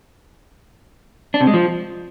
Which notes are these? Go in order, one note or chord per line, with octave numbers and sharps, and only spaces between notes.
D4
C3
G#3
F3